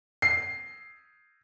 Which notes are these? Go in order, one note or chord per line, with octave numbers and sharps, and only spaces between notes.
C7